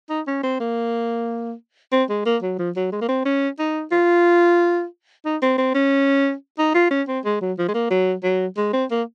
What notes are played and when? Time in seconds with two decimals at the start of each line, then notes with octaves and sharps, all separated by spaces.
0.10 D#4
0.27 C#4
0.43 C4
0.60 A#3
1.92 C4
2.09 G#3
2.26 A#3
2.42 F#3
2.59 F3
2.76 F#3
2.92 G#3
3.01 A#3
3.09 C4
3.25 C#4
3.59 D#4
3.92 F4
5.25 D#4
5.42 C4
5.58 C4
5.75 C#4
6.58 D#4
6.74 F4
6.91 C#4
7.08 C4
7.25 G#3
7.41 F#3
7.58 F3
7.68 G#3
7.74 A#3
7.90 F#3
8.23 F#3
8.57 G#3
8.73 C4
8.91 A#3